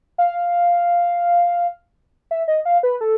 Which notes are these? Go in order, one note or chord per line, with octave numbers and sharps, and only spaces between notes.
F5
E5
D#5
F5
B4
A4